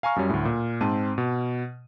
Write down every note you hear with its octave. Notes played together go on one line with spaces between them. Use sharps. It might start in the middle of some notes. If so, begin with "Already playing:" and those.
F5 G#5 A#5 C#6 F6
F#2 F#3 G3 C#4
D2 A2
A#2
G#2 C4 A5 C6 D#7
B2